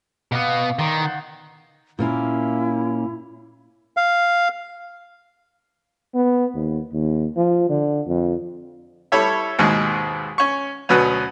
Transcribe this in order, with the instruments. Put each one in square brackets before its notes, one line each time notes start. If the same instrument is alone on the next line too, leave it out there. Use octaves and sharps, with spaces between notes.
[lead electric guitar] B2 B3 [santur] F5 D6
[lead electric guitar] D#3 [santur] D5 A5 C6
[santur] D#4 F#5
[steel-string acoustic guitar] A#2 A#3 C#4 [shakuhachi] E4
[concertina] F5
[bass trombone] B3
D#2
D#2
F3
D3
F2
[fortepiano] G3 E4 A4 C#5 E5
D#2 G#2 B2 D#3 G#3
C#4 C#6
D2 B2 F#3 B3 C#4